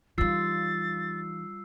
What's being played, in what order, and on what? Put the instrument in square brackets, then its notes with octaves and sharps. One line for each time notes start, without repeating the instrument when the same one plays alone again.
[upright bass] E3 D#4 [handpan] G3 F4 [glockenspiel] E6 C7 [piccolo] A6